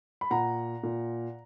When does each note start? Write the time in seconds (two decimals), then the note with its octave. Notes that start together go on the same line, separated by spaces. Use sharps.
0.21 B5
0.30 A#2 F#5 A#5
0.83 A#2